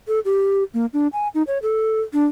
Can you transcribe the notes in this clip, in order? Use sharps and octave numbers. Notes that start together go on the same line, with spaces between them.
A4
G4
A#3
D4
G#5
D#4
C#5
A4
D4